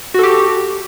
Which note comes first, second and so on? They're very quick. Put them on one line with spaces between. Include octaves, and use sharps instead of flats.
F#4 A4 G4